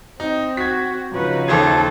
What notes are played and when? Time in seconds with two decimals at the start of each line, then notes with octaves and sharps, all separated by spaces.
0.20 C4 D#4
0.57 F#4 G#6 B6
1.12 C#3 F3 D#4 F#4 B4
1.48 D#2 A4 C5 G#6